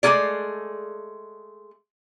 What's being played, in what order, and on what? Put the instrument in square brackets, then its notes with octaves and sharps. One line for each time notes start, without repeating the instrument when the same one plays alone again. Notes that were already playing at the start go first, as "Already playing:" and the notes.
[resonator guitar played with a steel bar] G#3 A3 C#4 F4 G#4 D5